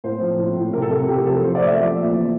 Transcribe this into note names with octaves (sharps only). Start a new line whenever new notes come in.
A2 C5
F3
A2
A2
C3 A#4
A4
A3 A#4
A4
C3 G4
F3 A4
F3 C5
D5
A3
E5
F3 D5
A#2
E3